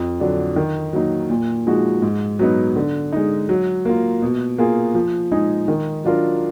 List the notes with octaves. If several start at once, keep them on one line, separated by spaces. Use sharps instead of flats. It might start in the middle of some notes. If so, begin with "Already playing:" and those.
Already playing: F2
D3 F#3 D4
D#3
F#3 A#3 D#4
A#2
F3 G#3 D#4 F#4
G#2
F#3 B3 D#4
D3
G#3 D#4
F#3
A#3 F4
B2
A#3 F4 G#4
F3
G#3 D#4 G#4
D#3
F#3 D4 F4 A#4